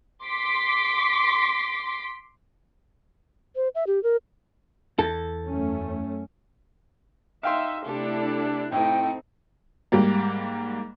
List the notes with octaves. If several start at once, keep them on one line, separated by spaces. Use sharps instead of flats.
C6 D6 B6
C5
E5
G4
A#4
E2 A4
F#2 A3 C#4
D#4 E5 F5 G5 C6
C3 A3 D4 E4 G4 A4
A2 C4 D#4 A4 G5
G#2 G3 A#3